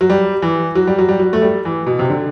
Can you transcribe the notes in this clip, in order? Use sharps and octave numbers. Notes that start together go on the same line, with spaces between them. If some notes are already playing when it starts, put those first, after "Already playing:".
F#3
G3
E3
F#3
G3
F#3
G3
F#3
A3
G3
E3
B2
C3
D3